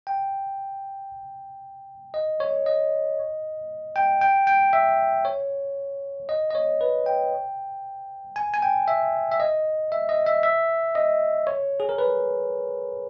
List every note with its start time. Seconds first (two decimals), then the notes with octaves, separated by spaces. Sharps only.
0.07 G5
2.14 D#5
2.40 C#5
2.66 D#5
3.96 G5
4.21 G5
4.47 G5
4.73 E5
5.25 C#5
6.29 D#5
6.51 D#5
6.55 C#5
6.81 B4
7.06 G5
8.36 G#5
8.54 G#5
8.62 G5
8.88 E5
9.32 E5
9.40 D#5
9.92 E5
10.09 D#5
10.26 E5
10.43 E5
10.95 D#5
11.47 C#5
11.80 G#4
11.89 A#4
11.98 B4